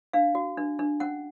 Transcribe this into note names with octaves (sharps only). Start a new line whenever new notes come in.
D4 F5
F#4
D4
D4
C#4 F#5